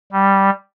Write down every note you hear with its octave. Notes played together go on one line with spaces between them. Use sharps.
G3